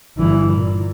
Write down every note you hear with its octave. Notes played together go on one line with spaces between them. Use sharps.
G1 E3
A#2